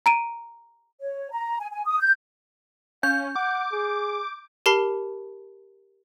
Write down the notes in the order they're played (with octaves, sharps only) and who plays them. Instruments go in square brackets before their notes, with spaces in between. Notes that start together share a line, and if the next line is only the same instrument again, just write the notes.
[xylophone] A#5 D7 D#7
[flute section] C#5
A#5
G#5
G#5
D#6
G6
[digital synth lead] C#4 [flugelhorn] F5 [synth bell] G6
[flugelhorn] F#5 [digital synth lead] D6
[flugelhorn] G#4
[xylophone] G4 A#4 A5 B5 C7 G7